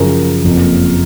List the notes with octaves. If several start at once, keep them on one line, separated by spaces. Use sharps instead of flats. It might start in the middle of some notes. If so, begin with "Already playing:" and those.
Already playing: F#2 C#3 F3 A#4
F#1 F2 F3 A#3